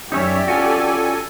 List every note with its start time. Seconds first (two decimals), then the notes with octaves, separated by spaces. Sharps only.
0.12 F#2 C#4 D#4 G4 C#5 D5 E5
0.48 C#4 F4 F#4 A4 G#5